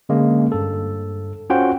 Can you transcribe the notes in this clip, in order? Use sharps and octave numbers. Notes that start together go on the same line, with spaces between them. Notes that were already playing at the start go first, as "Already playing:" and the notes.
D3 G#3 A#3 C#4
G2 A4
C#4 F4 F#4 C5 F#5 G5